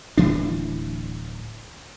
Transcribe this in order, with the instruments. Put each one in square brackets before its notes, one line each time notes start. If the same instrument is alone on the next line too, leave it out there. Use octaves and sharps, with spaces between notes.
[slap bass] D1 E3 D4